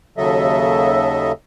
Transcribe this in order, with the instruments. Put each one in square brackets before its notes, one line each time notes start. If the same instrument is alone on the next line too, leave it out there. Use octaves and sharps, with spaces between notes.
[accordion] D#2 C#3 F#3 A4 D#5 E5